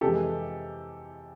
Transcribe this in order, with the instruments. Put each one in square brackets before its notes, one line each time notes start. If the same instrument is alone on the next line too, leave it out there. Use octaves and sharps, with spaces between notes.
[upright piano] F2 C3 E3 G#3 G4 A4